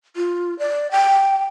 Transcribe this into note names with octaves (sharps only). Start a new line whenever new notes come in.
F4
D5
G5